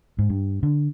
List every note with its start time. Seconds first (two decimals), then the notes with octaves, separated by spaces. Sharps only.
0.18 G#2
0.30 G2
0.63 D3